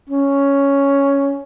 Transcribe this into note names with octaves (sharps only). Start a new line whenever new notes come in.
C#4